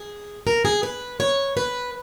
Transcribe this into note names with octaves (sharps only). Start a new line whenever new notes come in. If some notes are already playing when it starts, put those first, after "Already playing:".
Already playing: G#4
A#4
G#4
B4
C#5
B4